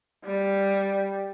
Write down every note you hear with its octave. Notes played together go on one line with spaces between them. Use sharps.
G3